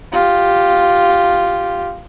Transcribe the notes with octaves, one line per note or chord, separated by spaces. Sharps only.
F4 G4